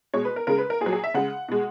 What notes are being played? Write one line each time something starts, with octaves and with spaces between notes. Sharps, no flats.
B2 G#3 C#5
B4
A#4
C#3 G#3 A#4
B4
A#4
A#2 G#4
F#3
G#4
E5
C#3 G#3 F#5
B2 G#3